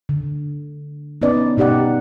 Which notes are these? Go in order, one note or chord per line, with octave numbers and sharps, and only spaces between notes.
D3
B3 C#4 D#4 B4 D5 D#5
B2 D#4 G4 D5 F#5